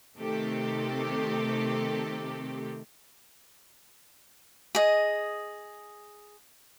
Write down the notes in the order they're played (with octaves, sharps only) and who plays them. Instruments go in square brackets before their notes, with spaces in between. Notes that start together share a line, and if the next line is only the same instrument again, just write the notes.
[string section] C3 D#3 A3 C4 G4 A4
[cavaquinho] G#4 D#5